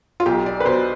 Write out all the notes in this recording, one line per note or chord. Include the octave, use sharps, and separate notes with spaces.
F4
B1 G4
D5
B4
B2 C5